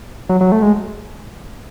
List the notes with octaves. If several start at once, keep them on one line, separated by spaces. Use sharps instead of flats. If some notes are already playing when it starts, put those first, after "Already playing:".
F#3
F#3
A3
G#3